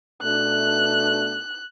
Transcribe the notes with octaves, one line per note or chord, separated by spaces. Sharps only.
B2 A3 D4 F#6